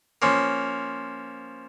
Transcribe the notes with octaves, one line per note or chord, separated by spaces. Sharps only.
F3 A#3 C#4